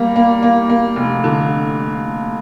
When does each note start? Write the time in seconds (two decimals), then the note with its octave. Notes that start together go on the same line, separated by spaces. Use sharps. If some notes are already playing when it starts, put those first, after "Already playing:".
Already playing: G3 A#3
0.16 A#3
0.43 A#3
0.70 A#3
0.96 F1
1.24 D3